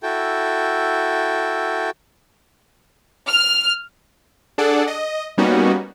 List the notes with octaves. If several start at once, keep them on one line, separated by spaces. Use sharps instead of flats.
E4 F#4 A4 G5
F6
D4 G#4 A4 D5 F#5
D#5
G3 A#3 B3 C#4 D#4 F#4